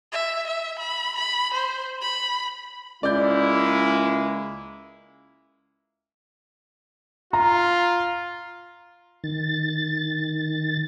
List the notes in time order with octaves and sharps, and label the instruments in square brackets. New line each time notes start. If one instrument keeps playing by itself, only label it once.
[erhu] E5
E5
B5
B5
C5
B5
[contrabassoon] C#2 [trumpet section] G#3 A#3 E4 [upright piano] D5 G6
[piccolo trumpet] F4 [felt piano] A#5
[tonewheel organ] D#3 A6